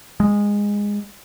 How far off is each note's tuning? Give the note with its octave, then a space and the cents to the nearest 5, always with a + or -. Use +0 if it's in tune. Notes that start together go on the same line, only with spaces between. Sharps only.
G#3 -15